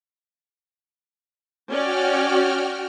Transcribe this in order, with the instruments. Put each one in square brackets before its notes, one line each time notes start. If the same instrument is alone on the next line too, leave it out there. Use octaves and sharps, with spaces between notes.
[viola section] C#4 D5 [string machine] F#4 G5 F6